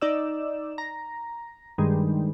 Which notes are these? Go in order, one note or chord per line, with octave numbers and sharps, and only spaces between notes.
D#4 D5 E6
A#5
G2 D#3 G#3